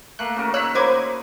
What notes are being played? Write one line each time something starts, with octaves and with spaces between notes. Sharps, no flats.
A3 A#3 F#6
C#3 F#4 A#4
D#4 C#5 E5 E6 F#6
A#3 F#4 B4 C5 D6 G#6